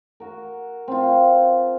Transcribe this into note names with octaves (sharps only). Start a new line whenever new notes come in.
F#4 A#4
C4 F4